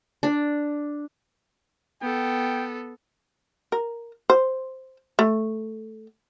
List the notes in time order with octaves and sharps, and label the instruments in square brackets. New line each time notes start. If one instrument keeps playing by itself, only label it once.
[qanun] D4
[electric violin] B3 A4 [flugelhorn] G5
[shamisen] A#4
C5
A3